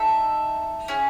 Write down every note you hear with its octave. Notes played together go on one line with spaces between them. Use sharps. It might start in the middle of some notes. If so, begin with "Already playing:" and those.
Already playing: D#4 A4 E5
C#4 G#4